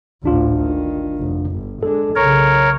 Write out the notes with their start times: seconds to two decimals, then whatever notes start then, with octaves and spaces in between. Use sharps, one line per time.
0.24 G#1 D2 A2 D4 F4
0.60 D#3
1.19 F1
1.50 G1
1.83 G#3 D4 A4
2.16 B1 C#3 A#4 C#5